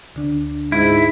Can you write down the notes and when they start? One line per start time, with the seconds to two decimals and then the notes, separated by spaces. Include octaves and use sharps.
0.14 D2 D3 D4
0.72 G#2 E4